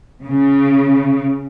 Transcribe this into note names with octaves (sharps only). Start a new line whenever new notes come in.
C#3